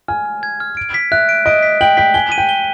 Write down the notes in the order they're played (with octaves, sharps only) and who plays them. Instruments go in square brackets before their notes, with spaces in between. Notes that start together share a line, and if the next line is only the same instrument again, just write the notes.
[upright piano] G#5 [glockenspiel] F6
[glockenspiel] F6
G#6
F6
D7
B6
[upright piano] E5 [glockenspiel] F#6
[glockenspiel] D7
[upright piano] D#5 [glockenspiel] D7
[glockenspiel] B6
[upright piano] G5 [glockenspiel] F#7
[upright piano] G5 [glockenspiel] B6
[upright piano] G#5 [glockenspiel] G7
[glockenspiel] D#7
[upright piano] G5
[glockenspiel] G7